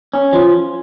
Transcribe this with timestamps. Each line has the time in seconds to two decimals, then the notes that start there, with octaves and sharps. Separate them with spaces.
0.14 C#4
0.33 F3